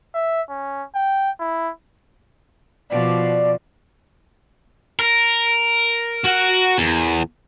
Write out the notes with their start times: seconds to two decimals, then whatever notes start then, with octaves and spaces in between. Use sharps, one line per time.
0.15 E5
0.50 C#4
0.95 G5
1.40 E4
2.90 B2 F3 D5
4.99 A#4
6.24 F#4 F#5
6.78 E2